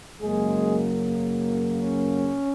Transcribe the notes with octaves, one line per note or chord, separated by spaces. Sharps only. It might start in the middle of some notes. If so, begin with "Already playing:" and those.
F#2 C#3 F#3 G#3 A#3 G#4
C#4